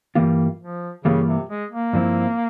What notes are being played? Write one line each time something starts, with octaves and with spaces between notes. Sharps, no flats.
G2 E3 G3 A#3 F4
F3
G2 C#3 E3 G3 A#3 F4
C3
G#3
A#3
G2 F3 C4 E4